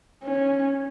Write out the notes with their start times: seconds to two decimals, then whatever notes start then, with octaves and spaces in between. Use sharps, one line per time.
0.23 C#4